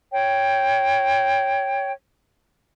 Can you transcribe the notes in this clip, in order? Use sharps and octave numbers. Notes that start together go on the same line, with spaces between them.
C#5 G5